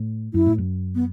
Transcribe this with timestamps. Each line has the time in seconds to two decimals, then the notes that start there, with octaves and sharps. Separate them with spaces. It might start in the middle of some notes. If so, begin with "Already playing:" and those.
Already playing: A2
0.34 F#2 E4
0.46 A2
0.58 F#2
0.95 B3